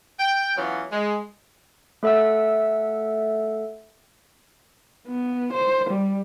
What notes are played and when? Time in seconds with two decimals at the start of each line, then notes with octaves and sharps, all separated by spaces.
0.20 G5
0.57 E3 F#3 B3 C#4 F4
0.91 G#3
2.03 A3 A4 E5 F#5 E6
5.07 B3
5.53 C5
5.90 G3